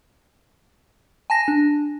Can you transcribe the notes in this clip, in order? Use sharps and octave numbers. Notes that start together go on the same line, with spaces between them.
G#5 A5 A#6
D4